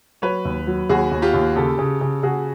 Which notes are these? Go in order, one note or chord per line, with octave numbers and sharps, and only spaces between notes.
F#3 B4 C#5
D#2
F#3
D#2 F#4 G#4
D#2
F4 G4
D#2
C#3 G4 A4
C#3
C#3
C#3 F#4 G#4